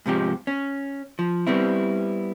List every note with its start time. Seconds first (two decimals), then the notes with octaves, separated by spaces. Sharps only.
0.06 G#2 C3 F3 G4
0.47 C#4
1.19 F3
1.47 G3 B3 C4 E4